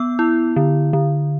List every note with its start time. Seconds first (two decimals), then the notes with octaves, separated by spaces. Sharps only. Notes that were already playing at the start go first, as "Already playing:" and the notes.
Already playing: B3 E6
0.19 E4
0.56 D3
0.93 D3